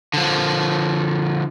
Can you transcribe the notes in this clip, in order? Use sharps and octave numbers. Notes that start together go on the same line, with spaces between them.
D3 F3